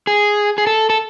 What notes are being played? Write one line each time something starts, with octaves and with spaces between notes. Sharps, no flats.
G#4
G#4
A4
A4